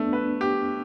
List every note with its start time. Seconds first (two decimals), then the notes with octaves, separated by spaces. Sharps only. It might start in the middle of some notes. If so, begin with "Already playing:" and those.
Already playing: A3 B3 D4
0.13 B4
0.41 G4